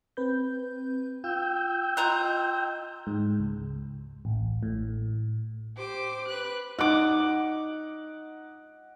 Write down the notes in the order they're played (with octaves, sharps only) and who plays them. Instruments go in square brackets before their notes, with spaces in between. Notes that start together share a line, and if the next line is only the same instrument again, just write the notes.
[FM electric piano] C4 B4 G6
[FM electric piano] F4 [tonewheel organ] G5 E6 G6
[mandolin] F4 A#5 F#6 [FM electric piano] D#5
[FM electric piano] G#2
C#2
A1
A2
[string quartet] G4 C5 D6
B4 F#6
[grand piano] D#4 [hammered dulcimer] F#5 D6